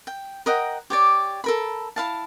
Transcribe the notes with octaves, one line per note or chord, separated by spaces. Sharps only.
G5
A#4 D#5 F#5 G5
G4 C#5 D5
A4 A#4 B5
E4 F5 A5